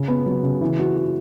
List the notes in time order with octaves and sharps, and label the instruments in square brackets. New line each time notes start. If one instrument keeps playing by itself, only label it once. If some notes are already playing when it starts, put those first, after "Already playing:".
Already playing: [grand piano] C#3
B3
F#3
C#3
E3
F#4
F#4